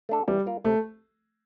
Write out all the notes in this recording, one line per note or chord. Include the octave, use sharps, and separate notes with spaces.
A3 D4 A4
E3 G3
A#3 F4 A#4
C3 A3